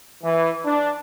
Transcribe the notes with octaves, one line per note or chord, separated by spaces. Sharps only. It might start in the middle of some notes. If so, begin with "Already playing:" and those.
E3
D4